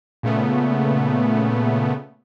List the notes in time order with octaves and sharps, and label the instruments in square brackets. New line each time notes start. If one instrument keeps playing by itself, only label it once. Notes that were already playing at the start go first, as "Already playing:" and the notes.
[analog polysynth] A#2 C#3 A3 B3